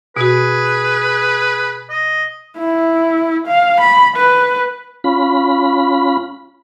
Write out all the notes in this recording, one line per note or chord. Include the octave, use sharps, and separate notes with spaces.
B2 F#4 G#4 B4
D#5
E4
F5
B5
B4
C#4 F4 B5